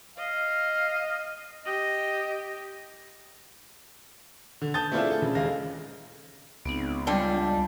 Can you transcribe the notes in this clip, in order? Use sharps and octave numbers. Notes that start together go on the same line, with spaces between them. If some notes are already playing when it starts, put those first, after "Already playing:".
D#5 F5
G4 D#5
D3
A5 D#6 G6 A6
A3 C4 D4 E4 F4 G#4
A4
C#3
D#2 G#3 F5 A#6
C#2 B3 C4 D#4
G3 C4 D4 F4 G5 D6